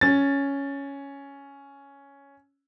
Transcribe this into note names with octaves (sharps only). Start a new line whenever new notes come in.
C#4 A6